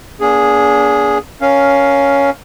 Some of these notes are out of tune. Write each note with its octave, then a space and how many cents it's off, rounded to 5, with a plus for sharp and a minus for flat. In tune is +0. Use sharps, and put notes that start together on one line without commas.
A#3 +40 D4 -35 G#4 +0
C#4 +10 A#4 +0 F5 +0